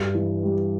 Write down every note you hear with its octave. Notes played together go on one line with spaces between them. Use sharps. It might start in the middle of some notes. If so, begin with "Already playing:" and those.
Already playing: G2
E3
G3